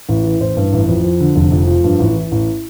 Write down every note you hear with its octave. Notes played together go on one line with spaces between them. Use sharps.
A1
E3
A1 C5
G2
A1
F2
F3
D3
F1
F2
F3
G2
A1
E3
A1